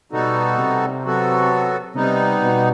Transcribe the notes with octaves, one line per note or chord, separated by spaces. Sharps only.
B2 G3 B3 D#4 F#4 A4
C3
F#3 B3 F#4 A4
C3 G3 B3 D#4
B2